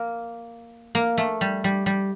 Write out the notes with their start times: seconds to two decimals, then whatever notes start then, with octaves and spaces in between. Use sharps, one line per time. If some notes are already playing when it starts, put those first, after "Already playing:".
Already playing: A#3
0.95 A#3
1.18 A3
1.41 G3
1.64 G3
1.86 G3